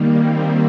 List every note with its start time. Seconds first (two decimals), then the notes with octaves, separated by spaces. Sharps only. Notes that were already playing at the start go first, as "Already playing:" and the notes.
Already playing: D#3 G3 A#3
0.16 C4